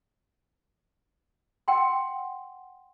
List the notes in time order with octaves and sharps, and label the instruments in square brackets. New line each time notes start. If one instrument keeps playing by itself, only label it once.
[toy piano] F#5 G5 C6